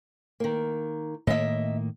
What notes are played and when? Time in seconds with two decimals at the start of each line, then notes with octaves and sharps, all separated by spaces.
0.40 D#3 A#3
1.27 A2 D#3 A#3 D#5 E5